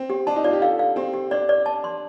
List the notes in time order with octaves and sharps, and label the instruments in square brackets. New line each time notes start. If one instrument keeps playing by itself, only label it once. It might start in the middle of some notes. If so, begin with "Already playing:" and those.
Already playing: [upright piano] C4
[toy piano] G4
[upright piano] D4 [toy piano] A5
[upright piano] D#4
[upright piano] F4 [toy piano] D5
[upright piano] G4
[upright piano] A4 [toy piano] F5
[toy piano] F5
[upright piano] C4 [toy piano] G4
[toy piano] G4
[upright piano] D4 [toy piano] D5
[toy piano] D5
A5
C6